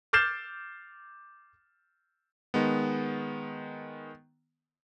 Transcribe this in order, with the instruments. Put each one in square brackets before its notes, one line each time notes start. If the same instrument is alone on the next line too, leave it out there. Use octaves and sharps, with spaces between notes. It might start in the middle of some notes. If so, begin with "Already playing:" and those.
[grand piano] D6 F6 G6 A6 C7 E7
[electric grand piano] D#3 G#3 B3